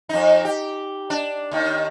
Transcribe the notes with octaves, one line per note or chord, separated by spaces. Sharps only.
F2 D#4
G4
D4
D#2 D#3